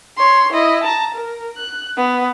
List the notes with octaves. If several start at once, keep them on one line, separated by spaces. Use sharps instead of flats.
C#5 C6
E4 D#5
A5 A#5
A#4
F#6
B3